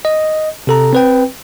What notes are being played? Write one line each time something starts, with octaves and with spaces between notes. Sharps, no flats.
D#5
C3 A4 A#5
C4 B4 G5